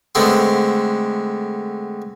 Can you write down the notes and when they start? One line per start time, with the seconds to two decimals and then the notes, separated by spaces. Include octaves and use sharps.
0.15 D3 G#3 A3 B3 C4